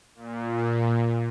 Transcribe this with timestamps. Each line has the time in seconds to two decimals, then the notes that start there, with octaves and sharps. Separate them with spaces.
0.16 A#2